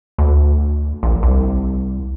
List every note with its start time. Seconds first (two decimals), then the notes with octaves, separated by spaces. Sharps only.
0.18 D2
1.03 A#1
1.23 C2